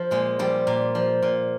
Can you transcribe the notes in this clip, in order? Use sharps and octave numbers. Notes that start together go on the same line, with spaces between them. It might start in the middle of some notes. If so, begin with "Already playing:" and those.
Already playing: F3
A#2 G#3
F3 G3
A#2
F3
A#2